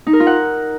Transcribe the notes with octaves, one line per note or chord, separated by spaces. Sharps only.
D#4
A#4
F4
F#5